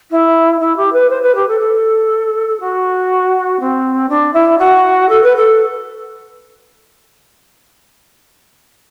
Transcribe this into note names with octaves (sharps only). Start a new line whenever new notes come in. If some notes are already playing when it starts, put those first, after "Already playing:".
E4
E4
G4
B4
C5
B4
G4
A4
A4
F#4
C4
D4
E4
F#4
A4
B4
A4